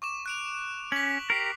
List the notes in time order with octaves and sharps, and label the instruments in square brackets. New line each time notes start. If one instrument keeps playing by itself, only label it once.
[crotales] C#6 D6 E7
F#6 D7 F7
[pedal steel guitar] C#4 [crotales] B6 F#7
[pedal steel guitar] G4 A#4 [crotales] C7